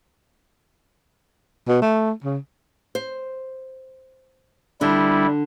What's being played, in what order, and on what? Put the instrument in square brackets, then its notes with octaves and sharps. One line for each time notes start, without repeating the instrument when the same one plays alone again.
[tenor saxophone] B2
A3
C#3
[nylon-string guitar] C5
[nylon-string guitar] D3 D4 [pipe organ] G3 E4